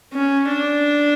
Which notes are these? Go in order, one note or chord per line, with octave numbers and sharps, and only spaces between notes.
C#4
D4